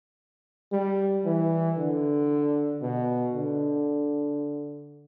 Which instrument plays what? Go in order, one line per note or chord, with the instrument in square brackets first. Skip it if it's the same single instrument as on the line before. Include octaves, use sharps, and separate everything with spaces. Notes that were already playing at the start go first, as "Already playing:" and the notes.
[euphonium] G3
E3
D3
B2
D3